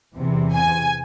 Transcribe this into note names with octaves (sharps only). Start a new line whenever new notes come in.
E2 C3 E3
G#5